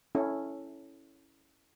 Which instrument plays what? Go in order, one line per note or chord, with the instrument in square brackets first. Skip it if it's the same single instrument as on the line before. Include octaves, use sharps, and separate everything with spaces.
[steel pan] C#4 E4 A4